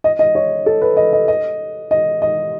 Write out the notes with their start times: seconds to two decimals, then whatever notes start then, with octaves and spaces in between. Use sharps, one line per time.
0.04 D#5
0.19 D#5
0.35 C#5
0.66 A4
0.82 B4
0.97 D#5
1.13 D#5
1.28 D#5
1.91 D#5
2.22 D#5